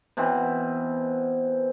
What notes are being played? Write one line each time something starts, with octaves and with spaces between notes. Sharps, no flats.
B2 E3 C4